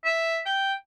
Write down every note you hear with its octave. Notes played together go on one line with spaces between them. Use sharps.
E5
G5